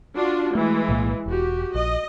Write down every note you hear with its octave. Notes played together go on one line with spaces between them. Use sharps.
D4 F4 F#4
E3 G#3 A3
B1 A2 A#3
E1 F#4 G4
A#1 D#5